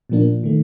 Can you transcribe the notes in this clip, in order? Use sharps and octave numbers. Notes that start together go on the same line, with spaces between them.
A#2 F3 A#3 D4
D#3 A3